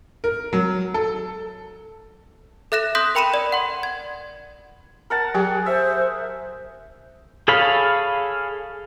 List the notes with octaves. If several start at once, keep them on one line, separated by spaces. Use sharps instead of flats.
A#4
F#3
A4
A4 E5 F#6 A#6 E7
C6 D#6 F#6 G6 A#6 B6
A#4 G5 B5 C#7 D#7 E7
D5
F#5 C6
G#6
A#4 F#5 A5
F#3 G4 G#4 G5
C5 E5
G#4 A4 C#5 F5 B5